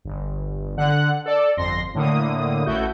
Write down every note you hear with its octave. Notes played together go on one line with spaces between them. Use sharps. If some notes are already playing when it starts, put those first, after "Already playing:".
G1
D3 F#5 F#6
A4 D5
G1 F2 C6 A#6
A2 D3 A#3 D#6
A1 A3 E4 F#4 G6